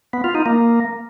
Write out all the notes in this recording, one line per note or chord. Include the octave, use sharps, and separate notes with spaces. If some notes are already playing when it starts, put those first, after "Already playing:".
B3
F4
D#4
A#3